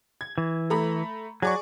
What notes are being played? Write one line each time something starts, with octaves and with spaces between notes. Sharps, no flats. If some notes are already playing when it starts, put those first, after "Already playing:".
G#6
E3
A3 A#5 B5
F#3 G#4 D5 C#6